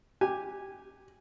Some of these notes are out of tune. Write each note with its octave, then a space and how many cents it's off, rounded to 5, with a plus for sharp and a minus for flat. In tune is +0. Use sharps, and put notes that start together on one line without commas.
G4 +0 G#5 -15